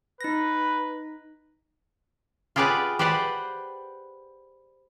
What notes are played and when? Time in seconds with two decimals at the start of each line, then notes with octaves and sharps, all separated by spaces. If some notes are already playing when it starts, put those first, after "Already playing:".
0.21 D#4 B4 A#6
2.56 F4 G4 G#4 B4 D5 F#5
2.99 G4 B4 C5 D5 F#5